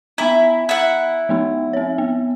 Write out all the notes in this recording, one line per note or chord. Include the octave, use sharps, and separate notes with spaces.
B3 E4 G#5 A#5
E4 F#5
F3 B3 D#4
C4 C#5
B3